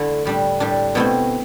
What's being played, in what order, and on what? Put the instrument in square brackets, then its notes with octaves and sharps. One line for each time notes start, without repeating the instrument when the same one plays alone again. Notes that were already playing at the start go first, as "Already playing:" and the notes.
Already playing: [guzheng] D3 A3 E4
A2 G3 D4
A2 G3 D4
B2 A3 C4 E4